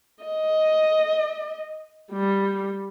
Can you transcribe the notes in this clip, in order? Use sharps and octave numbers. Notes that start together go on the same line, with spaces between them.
D#5
G3